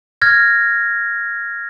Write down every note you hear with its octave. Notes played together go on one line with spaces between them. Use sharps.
F6 G#6 A#6